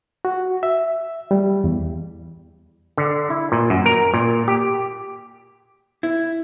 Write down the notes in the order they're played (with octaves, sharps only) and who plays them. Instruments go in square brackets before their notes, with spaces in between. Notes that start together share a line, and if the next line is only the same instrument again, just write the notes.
[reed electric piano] F#4
E5
G3
E2
[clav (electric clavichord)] D3
E4
A#2
F#2
A#4
A#2
G4
[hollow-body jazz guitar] E4